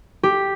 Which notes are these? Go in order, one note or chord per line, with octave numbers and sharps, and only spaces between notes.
G4